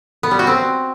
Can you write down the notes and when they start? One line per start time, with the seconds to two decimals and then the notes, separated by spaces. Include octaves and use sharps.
0.23 B3
0.31 G3
0.39 F#4
0.47 C4